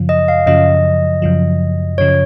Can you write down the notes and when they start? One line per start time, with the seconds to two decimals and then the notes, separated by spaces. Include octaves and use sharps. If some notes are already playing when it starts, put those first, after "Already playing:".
Already playing: F#2 C#3 F3
0.09 D#5
0.28 F5
0.46 F#2 C#3 F3 D#5
1.22 F#2 C#3 F3
1.98 F#2 C#3 F3 C#5